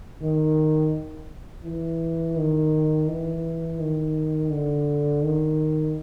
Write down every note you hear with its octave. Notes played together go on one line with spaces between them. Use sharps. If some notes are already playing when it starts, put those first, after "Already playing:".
D#3
E3
D#3
E3
D#3
D3
D#3